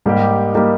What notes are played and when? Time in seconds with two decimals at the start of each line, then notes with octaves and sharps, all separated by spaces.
0.06 G#2 G3 A#3 D#4 G4
0.54 G3 A#3 D#4 G4